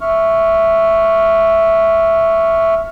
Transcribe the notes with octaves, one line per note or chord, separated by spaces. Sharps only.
E5 C#6 F6